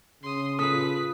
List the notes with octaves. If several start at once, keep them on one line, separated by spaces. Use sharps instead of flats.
C#3 C6 D#6
F4 A4 B4 D#6 B6